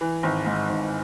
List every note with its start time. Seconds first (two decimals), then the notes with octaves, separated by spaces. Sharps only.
0.01 E3
0.23 G#1
0.46 G#2
0.69 G#1